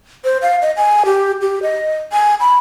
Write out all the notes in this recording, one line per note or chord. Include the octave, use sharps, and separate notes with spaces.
C5
F5
D#5
G#5
G4
G4
D#5
G#5
B5